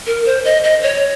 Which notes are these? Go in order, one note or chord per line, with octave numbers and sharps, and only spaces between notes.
A#4
C5
D#5
D#5
C#5